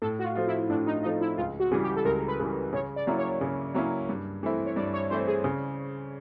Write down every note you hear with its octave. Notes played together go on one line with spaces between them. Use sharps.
A2 A4
F#4
F4
F3 A3 C4 F4
E4
A2 D4
D#4
F3 A3 C4 D#4 F4
E4
C#2 F4
F#4
C#3 E3 G3 G#4
G4
A4
C#2 A#4
B4
C#3 E3 G3
C#3 C#5
D5
F#3 A#3 C#4 E4
C#5
C#3
F#3 A#3 C#4 E4
G2
E3 A3 C4 E4
C#5
G2 D5
C#5
E3 A3 C4 E4 C5
G#4
C#3